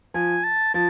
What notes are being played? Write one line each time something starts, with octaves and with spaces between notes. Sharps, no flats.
F3 G#5
A5
F3 A5